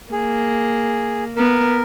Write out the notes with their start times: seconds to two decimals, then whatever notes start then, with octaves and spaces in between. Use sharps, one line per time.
0.12 A#3 G#4
1.36 B3 A#4